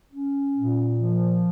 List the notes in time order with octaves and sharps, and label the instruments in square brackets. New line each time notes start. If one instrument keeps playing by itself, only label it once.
[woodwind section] C#4
A#2
F3